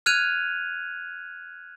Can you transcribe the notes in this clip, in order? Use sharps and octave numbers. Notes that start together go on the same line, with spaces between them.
F6 F#6 G#6 D#7 F7